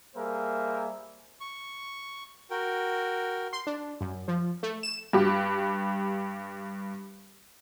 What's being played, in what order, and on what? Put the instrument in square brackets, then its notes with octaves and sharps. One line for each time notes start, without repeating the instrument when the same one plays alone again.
[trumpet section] G3 A#3 G#4 A#4 C5 E5
[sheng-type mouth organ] C#6
F#4 A#4 G5
[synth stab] C6
D4
F#2
F3
A3
E7
[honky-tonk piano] G2 G4